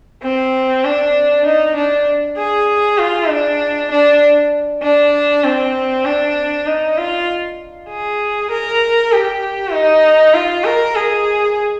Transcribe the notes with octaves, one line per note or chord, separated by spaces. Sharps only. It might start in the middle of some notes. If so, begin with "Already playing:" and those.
C4
D4
D#4
D4
G#4
F4
D4
D4
D4
C4
D4
D#4
F4
G#4
A#4
G4
D#4
F4
A#4
G#4